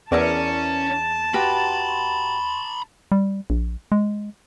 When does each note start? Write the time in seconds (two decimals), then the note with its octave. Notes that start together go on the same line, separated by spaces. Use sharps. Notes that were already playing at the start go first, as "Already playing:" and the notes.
0.12 E2 C#4 E4 A#4 D5 A5
1.34 F#4 G4 B4 A#5 B5
3.12 G3
3.50 A#1
3.92 G#3